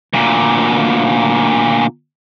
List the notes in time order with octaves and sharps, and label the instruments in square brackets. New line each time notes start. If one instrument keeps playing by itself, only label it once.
[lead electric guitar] D2 A#2